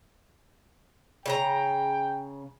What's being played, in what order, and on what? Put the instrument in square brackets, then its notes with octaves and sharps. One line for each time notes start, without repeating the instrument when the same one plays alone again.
[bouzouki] C#3 A4 A#5 [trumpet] G5